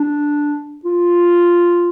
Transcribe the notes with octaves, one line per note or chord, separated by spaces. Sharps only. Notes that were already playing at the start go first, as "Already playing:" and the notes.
Already playing: D4
F4